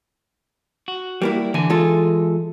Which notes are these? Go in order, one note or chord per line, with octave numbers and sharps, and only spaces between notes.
F#4
G3 A#3 E4
D3 E3 G#5
G#3 F4 A4